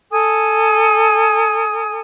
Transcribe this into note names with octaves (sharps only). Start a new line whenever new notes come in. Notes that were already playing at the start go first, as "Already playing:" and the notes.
A4 G#5 D#6